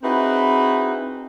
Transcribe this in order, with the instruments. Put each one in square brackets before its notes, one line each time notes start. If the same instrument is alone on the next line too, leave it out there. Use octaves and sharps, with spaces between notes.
[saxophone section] C4 D#4 E4 F#4 G#4 B4